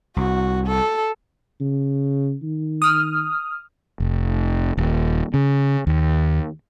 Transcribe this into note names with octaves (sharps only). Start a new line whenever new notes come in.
C2 F#4
A4
C#3
D#3
D#6 F6
F1
D#1
C#3
D#2